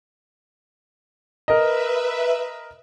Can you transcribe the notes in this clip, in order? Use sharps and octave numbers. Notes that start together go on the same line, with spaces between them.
A#4 B4 D#5 E5